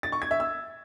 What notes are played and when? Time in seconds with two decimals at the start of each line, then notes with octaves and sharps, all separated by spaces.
0.03 A6
0.12 C#6
0.22 G#6
0.31 E5
0.40 E6